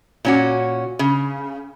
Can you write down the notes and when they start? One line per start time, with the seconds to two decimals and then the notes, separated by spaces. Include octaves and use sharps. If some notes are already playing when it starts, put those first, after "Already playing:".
0.25 A#2 C#4 F#4
0.99 C#3